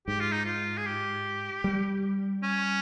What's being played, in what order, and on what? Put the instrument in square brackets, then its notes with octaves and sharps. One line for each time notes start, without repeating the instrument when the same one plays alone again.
[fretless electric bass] G#2 [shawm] G4
[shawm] F4
D#4
F4
G#4
G4
[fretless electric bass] G3
[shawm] C#4